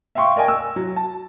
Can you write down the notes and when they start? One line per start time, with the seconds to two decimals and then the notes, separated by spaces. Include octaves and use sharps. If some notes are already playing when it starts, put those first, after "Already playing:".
0.15 E5 F5 G5 C6 C#6
0.36 A#4 D5 D#5 G5 G#5
0.48 E6
0.76 F#3
0.96 A5